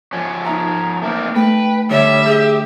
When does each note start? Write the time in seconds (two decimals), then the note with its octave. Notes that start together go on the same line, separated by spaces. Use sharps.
0.13 F3 C#4
0.45 D#4 E5 A#5
1.02 A3 A#3 C4
1.36 A3 B4 G5
1.91 D3 G3 C#5 E5
2.26 G4 G#4